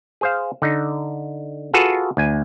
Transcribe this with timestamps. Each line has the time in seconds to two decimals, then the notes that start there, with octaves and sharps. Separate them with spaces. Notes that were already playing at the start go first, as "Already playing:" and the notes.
0.21 G#4 C5 F5
0.62 D3 D#4
1.73 F4 F#4 G#4 A4 B4 F5
2.17 D2 G#5